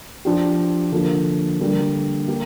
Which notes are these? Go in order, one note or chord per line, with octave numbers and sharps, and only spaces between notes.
F3 D4 G4
D3 F3 A#3
D3 G3 A#3
A#3 G4 A#4